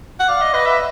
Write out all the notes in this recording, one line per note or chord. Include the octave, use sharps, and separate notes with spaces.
F#5
D5 F5
D#5
B4 D#5
E5